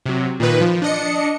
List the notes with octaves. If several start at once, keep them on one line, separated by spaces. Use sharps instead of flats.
C3 F#3
A#2 D#3 B4
F3
D4 D#5 C#7